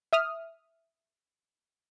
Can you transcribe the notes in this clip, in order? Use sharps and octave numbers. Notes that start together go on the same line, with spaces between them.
E5 D#6 F6